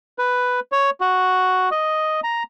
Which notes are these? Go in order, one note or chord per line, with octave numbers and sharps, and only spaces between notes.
B4
C#5
F#4
D#5
A#5